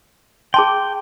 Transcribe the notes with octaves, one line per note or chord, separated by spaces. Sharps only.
G#4 G5 A5 C6